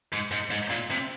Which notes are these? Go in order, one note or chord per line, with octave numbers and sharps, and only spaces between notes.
G#2
G#2
G#2
A#2
C3